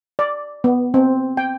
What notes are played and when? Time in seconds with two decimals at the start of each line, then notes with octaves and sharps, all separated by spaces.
0.19 D5
0.64 B3
0.94 C4
1.37 G5